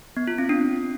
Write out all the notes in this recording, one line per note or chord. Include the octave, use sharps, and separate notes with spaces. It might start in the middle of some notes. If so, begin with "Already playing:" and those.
B3
F4
C4
D4